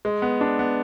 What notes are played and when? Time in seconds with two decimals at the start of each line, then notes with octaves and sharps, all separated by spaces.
0.05 G#3
0.22 B3
0.41 D4
0.59 B3